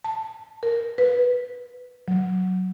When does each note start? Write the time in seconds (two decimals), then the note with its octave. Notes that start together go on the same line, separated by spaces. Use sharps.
0.04 A5
0.63 A#4
0.98 B4
2.08 F#3